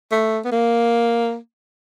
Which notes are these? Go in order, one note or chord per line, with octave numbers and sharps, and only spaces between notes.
A3
B3
A#3